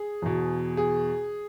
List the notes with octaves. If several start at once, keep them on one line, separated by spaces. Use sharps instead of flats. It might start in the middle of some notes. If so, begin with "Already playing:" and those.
Already playing: G#4
E2 B2
G#4